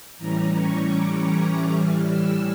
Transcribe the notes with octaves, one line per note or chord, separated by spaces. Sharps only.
A2 E3 G3 C#4 A#5
C#6
D6
A2 E3 G3 F6
E6